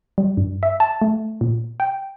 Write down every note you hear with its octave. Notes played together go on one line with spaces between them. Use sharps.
G3
G2
E5
A5
A3
A#2
G5